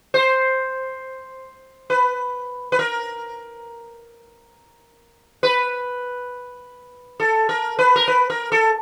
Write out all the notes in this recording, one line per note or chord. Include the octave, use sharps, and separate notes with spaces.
C5
B4
B4
A#4
B4
A4
A#4
B4
A#4
B4
A#4
A4